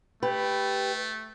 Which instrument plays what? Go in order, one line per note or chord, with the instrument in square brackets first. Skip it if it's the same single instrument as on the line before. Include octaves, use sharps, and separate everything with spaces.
[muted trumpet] A3 [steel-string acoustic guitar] G4 B4